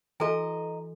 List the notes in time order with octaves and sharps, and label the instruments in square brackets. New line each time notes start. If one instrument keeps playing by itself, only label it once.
[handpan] E3 [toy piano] F#4 A4 G#5 [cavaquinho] D#5 A#5